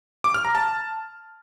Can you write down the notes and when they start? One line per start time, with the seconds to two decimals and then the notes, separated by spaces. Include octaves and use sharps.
0.24 D6
0.34 F6
0.45 A#5
0.55 A5